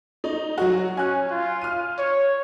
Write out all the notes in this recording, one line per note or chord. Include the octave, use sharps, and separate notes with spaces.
D#4
F#3 F#4
C#4 G#5 F#6
F4
F6 D#7
C#5